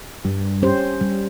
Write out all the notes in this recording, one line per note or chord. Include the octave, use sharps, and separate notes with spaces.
G2 G3
C#4 G4 C5
G3